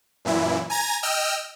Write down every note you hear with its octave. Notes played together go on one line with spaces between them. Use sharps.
F#2 A#2 E3 E4
G#5 A#5 G#6 A#6
D#5 G5 E6 F6